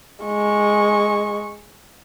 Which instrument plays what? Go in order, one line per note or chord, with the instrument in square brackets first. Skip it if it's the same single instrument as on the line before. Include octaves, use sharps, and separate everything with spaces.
[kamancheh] G#3 C#6